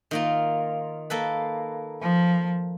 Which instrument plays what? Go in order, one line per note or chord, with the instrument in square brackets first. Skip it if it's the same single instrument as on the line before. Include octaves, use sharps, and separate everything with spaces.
[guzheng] D#3 A#3 F4
A#3 A4 B4
[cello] F3